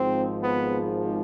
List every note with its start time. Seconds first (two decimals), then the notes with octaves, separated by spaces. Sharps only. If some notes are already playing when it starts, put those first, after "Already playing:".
Already playing: G#1 G#2 F3 C4
0.42 B3